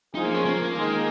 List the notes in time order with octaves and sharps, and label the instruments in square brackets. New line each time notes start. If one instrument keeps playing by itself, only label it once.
[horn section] F3 G#3 F4 G#4 [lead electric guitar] D#4
[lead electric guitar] A#3
C#4
A#3
[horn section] D#3 G#3 D#4 G#4